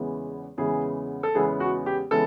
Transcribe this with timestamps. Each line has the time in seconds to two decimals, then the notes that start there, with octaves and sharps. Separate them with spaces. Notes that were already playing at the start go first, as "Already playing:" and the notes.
Already playing: E2 C#3 E3 G#3 B3
0.57 E2 C#3 E3 G#3 B3 G#4
1.23 A4
1.35 E2 C#3 E3 G#3 B3 G#4
1.60 F#4
1.86 G4
2.11 C#3 E3 G#3 B3 A4